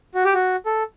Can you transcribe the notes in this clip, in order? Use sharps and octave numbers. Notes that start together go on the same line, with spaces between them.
F#4
G4
F#4
A4